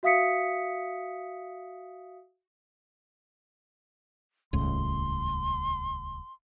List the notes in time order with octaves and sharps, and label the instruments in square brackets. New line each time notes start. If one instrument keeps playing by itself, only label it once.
[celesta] F#4 E5 F5 D#6 B6 C#7
[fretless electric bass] D#1 C#2 A2 [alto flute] C6